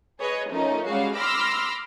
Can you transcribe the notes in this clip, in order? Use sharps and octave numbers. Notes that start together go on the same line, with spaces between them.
G#4 B4 C#5 D#5
F3 A3 C#4 D#4 A#4
G3 G#3 C#4 F#4 G#4 F5
B5 C6 D6 E6 F6 A#6